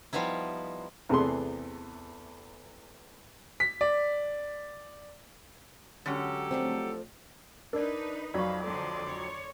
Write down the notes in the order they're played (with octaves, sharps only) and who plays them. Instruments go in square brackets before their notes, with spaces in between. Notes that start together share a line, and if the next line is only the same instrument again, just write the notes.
[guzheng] F3 G3 B3 D#4 E4
[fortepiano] E2 C3 A3 B3 G#4 C6
[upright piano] B6
D5
[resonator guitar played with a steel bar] D3 G#3 C#4 [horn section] F#3 G4 A4
[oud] F3 A3 D4 [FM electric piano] C4
[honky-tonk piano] D4 [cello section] D#4 B4 [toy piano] A#4 D5
[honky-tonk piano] F2 F#3 [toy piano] D5 C#6 [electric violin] F5 B5
[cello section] D3 F3 [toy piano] A4 [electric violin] D5 C6
[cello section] C#5